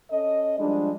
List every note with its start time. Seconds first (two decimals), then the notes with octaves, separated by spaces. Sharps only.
0.11 C#4 A4 D#5
0.58 F3 G3 G#3 D4